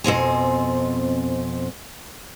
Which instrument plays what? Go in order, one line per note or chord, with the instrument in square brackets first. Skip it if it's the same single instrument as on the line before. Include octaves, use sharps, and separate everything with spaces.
[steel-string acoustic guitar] F2 B2 C4 G#5